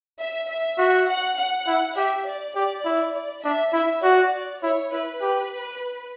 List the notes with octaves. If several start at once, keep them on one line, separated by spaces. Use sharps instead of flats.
E5
E5
F#4
F#5
F#5
E4
G4 E5
D5
G4 D5
E4
D5
D4 E5
E4 E5
F#4 D5
E4 C#5
E4 B4
G4